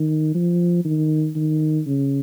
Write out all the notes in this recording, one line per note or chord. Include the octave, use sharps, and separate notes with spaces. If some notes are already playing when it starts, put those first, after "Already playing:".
Already playing: D#3
F3
D#3
D#3
C#3